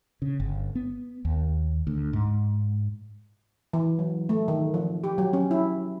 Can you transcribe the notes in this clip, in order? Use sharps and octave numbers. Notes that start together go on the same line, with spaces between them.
C#3
G1
B3
D#2
D2
G#2
E3
F#3
A3
D#3
F3
G4
F#3
C#4
E4